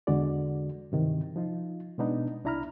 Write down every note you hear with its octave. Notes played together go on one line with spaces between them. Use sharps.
E2 D3 G#3 F#4 D5
G2 C3 D#3 E3
F3 D#4 F4
B2 G#3 B3 D4 D#4
C2 D4 E4 A#5 B5 F6